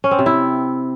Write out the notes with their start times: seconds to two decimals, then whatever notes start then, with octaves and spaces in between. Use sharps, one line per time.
0.04 C#4
0.11 C4
0.19 C3
0.26 E4